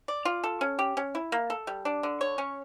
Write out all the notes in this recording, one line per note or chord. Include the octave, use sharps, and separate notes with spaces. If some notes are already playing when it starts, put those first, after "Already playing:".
D5
F4
A4
C#4
G4
C#4
E4
A#3
A4
G3
D4
D3
C#5
C#4